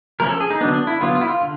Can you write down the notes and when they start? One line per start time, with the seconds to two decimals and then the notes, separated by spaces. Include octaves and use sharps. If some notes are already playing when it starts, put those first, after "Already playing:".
0.20 F3 A3 C#4 A#4
0.29 A4
0.40 G#4
0.50 D#4
0.61 D3 F#3 B3 D4
0.74 D4
0.87 E4
1.00 D3 F#3 B3 F4
1.15 F4
1.21 E4
1.28 F4
1.41 D3